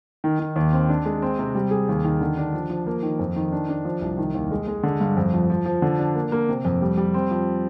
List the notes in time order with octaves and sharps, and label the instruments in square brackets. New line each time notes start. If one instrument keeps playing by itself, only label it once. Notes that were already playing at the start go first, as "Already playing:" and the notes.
[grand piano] D#3
D#3
D#2
C4
D4
G#3
C4
C3
G3
G#4
D#2
D#3
D3
D4
F3
F3
A#3
D#3
F2
D#3
D4
D4
F3
C2
D#3
D#2
G#3
G#3
D3
G2
F2
F3
F3
F3
D3
D4
A#3
A#3
C3
F2
G3
G3
C4
F3